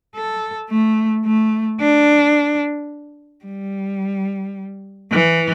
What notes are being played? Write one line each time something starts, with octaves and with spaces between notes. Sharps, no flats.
A4
A3
A3
D4
G3
E3